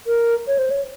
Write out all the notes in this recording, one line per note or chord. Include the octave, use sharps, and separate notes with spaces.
A#4
C#5
C5
C#5